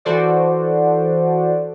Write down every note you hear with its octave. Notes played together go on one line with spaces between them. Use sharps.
E3 F#4 A4 C5 D5